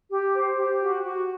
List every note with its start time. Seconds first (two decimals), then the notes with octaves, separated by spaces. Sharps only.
0.10 G4
0.34 C5
0.57 G4
0.80 F#4
1.04 F#4